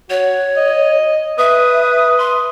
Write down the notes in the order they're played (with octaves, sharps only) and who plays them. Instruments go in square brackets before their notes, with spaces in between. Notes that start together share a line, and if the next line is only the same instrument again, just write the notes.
[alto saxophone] F#4 [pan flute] C#5
[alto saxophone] D#5
[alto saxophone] B4 [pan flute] E5 [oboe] D#6
[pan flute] C6